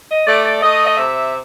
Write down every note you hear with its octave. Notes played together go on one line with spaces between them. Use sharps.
D#5
A3 D5
D5
A3 D#5
D#5
C3 E5